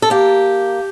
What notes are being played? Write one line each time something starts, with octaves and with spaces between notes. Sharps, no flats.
A4
A#3 G4